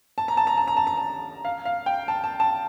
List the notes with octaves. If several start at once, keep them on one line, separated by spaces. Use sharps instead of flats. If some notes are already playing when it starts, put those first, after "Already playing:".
A5
A#5
A5
A#5
A5
A#5
A5
A#5
A5
F5
F5
G5
A5
A5
A5